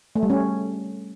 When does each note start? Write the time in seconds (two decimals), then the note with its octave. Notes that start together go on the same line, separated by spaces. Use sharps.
0.16 A3
0.23 G3
0.30 C#4